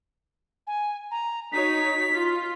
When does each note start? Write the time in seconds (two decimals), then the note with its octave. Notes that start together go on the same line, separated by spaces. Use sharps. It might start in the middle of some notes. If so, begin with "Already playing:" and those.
0.67 G#5
1.11 A#5
1.52 D#4 F#4 C#5 B6
2.14 F4